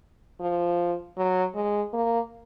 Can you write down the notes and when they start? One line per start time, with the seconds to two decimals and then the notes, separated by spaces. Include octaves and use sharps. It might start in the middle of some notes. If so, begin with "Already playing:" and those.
0.40 F3
1.17 F#3
1.55 G#3
1.93 A#3